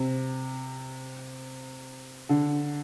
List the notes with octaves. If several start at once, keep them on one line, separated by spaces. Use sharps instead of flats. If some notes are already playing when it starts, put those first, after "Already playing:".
Already playing: C3
D3